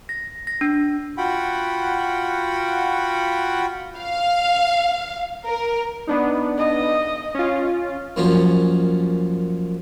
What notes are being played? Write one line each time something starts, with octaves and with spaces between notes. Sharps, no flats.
A#6
A#6
D4
F4 F#4 F#5 G5 B5
F5
A#4
B3 D4 D#4
D#5
C#4 F4
F#2 A#2 F3 C#4